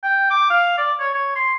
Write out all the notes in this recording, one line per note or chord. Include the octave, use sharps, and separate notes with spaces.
G5
D6
F5
D5
C#5
C#5
C6